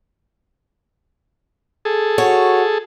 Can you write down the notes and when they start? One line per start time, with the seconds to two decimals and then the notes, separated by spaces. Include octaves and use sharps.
1.85 G#4 A4
2.18 F#4 C#5